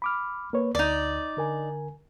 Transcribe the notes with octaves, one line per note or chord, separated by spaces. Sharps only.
B5 D6 F6
A#3 B4 C#5
D2 D#4 D5
D3 A#4 G#5